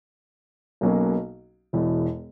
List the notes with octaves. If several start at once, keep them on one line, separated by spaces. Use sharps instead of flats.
B1 B2 F#3 A#3 C#4
E1 E2 B2